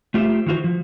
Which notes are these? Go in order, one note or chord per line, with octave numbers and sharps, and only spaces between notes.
A3 F4 G4 C5 E5
D#3 E3 F4 F#4 C5
F3